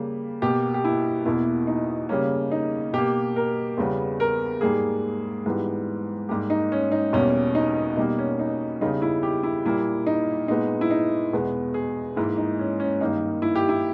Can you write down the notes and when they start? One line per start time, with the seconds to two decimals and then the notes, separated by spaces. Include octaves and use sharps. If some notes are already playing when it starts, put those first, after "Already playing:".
Already playing: C#3 G3 A#3
0.42 B2 A#3 G4
0.74 G4
0.84 E4
1.25 E2 B2 A#3 E4
1.67 D#4
2.09 C#3 G3 A#3 C#4
2.52 D#4
2.93 B2 A#3 G4
3.36 A#4
3.77 E2 C#3 G3 B3
4.20 A#4
4.61 G#2 G3 A#3 G#4
5.46 G#2 E3 G3 B3
6.29 G#2 G3 A#3 G4
6.50 D#4
6.72 C#4
6.92 D#4
7.13 E2 B2 G3 A#3 C#4
7.55 D#4
7.97 B2 G3 A#3 D#4
8.18 C#4
8.39 D#4
8.81 E2 C#3 G3 D#4
9.02 E4
9.23 G4
9.43 E4
9.65 A#2 G3 A#3 E4
10.06 D#4
10.48 A#2 G#3 B3 D#4
10.81 E4
10.91 D#4
11.33 E2 B2 G#3 B3
11.74 G#4
12.16 G#2 E3 A#3 E4
12.38 D#4
12.59 C#4
12.80 C#4
13.01 G2 D#3 A#3 D#4
13.42 E4
13.55 G4
13.69 E4